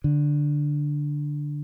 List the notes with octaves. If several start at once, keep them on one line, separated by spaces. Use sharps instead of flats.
D3